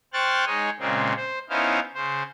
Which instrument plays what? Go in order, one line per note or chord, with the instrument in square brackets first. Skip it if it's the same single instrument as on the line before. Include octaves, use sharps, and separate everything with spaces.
[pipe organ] C5 G5 C#6 F6 F#6 A6
G#3 D#4 C#5 G#5
A#2 C#3 G#3 C4
C5
B3 C#4 D#4 E4 C5 F5
C#3 C5